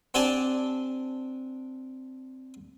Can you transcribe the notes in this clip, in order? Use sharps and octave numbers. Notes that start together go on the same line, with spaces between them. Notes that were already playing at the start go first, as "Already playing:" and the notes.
C4 D4 G4 G#5 A5 D6